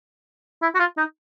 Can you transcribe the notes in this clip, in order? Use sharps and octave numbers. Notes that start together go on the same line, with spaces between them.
E4
F#4
F4
D#4